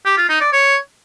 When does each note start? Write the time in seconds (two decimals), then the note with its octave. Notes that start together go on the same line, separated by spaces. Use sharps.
0.05 G4
0.17 F4
0.29 D#4
0.41 D5
0.52 C#5